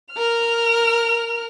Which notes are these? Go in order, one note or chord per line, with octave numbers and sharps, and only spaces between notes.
A#4 F6